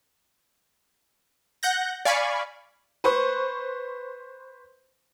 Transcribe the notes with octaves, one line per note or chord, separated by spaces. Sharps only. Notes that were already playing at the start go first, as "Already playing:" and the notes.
F#5 F#6 G6 A#6
D5 F5 G#5 B5 C#6
B4 C5 C#6